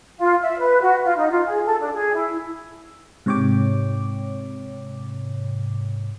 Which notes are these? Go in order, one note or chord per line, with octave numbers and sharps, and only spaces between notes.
F4
E5
B4
F#4
F4
D#4
F4
G#4
A4
D4
G#4
E4
G#2 C3 C#5 G5 D6